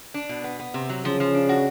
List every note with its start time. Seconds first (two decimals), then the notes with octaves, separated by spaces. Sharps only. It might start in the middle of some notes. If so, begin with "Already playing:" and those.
0.14 D4
0.29 B2
0.44 B3
0.59 B3
0.74 C3
0.90 F#3
1.05 C#3 F3
1.20 F3
1.35 D4
1.49 F#4